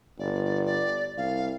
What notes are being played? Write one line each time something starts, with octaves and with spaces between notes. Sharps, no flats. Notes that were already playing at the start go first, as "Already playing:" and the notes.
G1 D5
D5
C2 F5